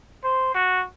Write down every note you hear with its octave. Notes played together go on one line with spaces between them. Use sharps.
C5
F#4